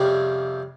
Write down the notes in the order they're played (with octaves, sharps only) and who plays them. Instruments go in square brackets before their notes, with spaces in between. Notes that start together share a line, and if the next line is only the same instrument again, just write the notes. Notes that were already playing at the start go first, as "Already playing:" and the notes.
Already playing: [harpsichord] F2 C3 G3 C#4 G#4